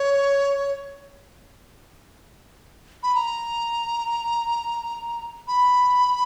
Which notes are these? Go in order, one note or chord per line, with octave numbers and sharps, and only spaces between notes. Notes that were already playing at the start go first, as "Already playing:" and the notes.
Already playing: C#5
B5
A#5
B5